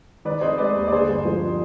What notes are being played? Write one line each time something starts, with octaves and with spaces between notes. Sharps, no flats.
D#3 B4 D5
F1 C5 D#5
G#3 B4 D5
D#2
D5
D3 G#4 C5
G1
F3